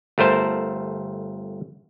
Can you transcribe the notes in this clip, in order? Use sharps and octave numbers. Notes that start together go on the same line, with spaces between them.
G1 A3 A#4 C5 A5